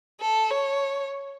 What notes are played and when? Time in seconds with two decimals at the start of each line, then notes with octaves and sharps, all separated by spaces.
0.21 A4
0.50 C#5